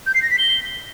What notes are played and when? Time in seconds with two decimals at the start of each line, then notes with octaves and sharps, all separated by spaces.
0.06 G6
0.14 C7
0.23 A#6
0.31 B6
0.39 G7